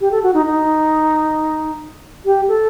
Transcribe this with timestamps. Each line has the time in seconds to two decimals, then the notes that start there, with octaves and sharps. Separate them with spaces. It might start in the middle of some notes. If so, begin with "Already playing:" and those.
0.01 G4
0.11 A4
0.23 F#4
0.34 D#4
0.46 D#4
2.25 G4
2.48 A4